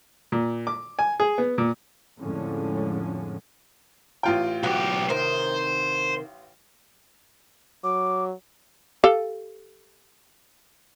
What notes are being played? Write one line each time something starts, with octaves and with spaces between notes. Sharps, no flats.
A#2
D6
G#5
G#4
B3
A#2
F2 A2 D3 F3 G#3 C#4
A1 F4 G5
B1 F#4 G4 F5
C3 D#3 A#4 C5
F#3 D6
G4 A4 F5